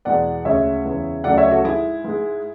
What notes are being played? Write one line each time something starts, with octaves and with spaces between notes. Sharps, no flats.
E2 B2 G#3 D5 F#5
D2 C#3 G#3 C#5 E5
E2 C#3 G#3
D2 C#3 F#3 A3 D5 F#5
C#5 E5
F#4 A4
G#2 G#3 E4 G#4
G#2 G#3